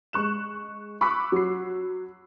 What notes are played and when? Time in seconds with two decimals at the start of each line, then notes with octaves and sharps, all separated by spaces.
0.13 G#3 C#6 F#6 E7
1.01 B5 C#6 D6 E6 F#6 B6
1.32 F#3 C7